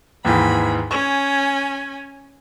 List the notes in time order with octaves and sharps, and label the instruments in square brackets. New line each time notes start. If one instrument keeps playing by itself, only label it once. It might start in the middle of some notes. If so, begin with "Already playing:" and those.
[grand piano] D#2 G#2 E3 [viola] B5
[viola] C#4 G#5 [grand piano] C#6